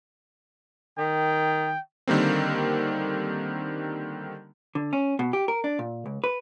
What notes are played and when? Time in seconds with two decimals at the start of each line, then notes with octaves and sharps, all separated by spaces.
0.98 D#3 G5
2.07 D3 D#3 G3 A#3 C4
4.75 D3
4.93 C#4
5.19 B2
5.33 G4
5.48 A#4
5.64 D4
5.79 A#2
6.06 C#2
6.24 B4